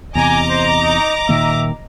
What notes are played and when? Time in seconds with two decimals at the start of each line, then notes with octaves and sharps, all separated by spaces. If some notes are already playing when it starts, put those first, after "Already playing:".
0.15 E2 C3 D#5 G#5 A#5 D6
0.49 C5
0.81 D#4
1.29 A#2 D#3 A#3 E5